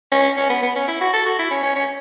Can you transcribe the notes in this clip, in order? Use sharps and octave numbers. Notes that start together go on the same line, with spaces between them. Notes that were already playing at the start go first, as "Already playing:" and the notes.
C#4
C#4
B3
B3
C#4
E4
F#4
A4
F#4
E4
C#4
C#4
C#4